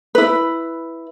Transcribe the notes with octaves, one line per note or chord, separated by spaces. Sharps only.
E4 B4